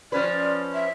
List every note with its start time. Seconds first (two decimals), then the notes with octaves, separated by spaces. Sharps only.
0.12 F3 C#4 B4 D5
0.74 E5